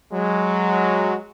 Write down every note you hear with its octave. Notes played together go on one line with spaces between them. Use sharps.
F#3 G#3